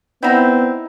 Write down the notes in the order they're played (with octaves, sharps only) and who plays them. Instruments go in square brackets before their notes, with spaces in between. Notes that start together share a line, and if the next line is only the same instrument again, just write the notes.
[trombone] B3 [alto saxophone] C4 [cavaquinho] D#4 E4 [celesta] D5 F#5 A#6